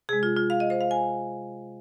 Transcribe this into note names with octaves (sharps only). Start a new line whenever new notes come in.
C3 G#3 G#4
F4
F4
F5
D#5
C5
F5
G#5